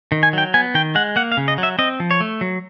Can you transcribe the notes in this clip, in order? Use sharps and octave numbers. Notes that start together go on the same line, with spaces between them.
D#3
G#5
F#3 G5
B3 G#5
D#3 G5
G#3 F#5
A#3 F#5
F5
C#3
D#5
F#3
E5
C4 D#5
F3
C#5
A3
F#3